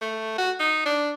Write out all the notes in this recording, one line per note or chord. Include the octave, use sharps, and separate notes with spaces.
A3
F#4
D#4
D4